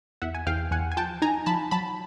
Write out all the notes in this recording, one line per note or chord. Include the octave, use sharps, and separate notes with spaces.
E2 E5 F#5
G#5
E2 F5 G5
E2 F#5 G#5
G#5
F3 G5 A5
D#4 G#5 A#5
F3 A5 B5
F#3 A5 B5